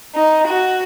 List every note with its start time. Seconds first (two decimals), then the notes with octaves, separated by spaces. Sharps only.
0.13 D#4
0.46 F#4